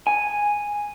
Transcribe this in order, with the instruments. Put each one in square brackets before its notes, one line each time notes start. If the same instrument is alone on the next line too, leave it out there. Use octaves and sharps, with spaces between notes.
[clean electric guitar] G#5